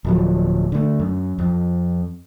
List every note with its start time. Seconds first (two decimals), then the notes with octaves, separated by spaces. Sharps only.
0.05 D1 F3 F#3
0.72 D3 A3
0.99 F#2
1.39 F2